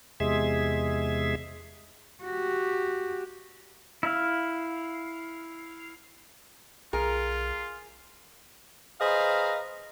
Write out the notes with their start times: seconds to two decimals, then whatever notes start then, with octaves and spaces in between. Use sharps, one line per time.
0.20 E2 C3 G#3 G#4 E5
2.24 F#4 G4
4.03 E4 F5
6.93 B1 F4 G#4 A#4
9.01 G#4 B4 C5 D#5 F5 A#5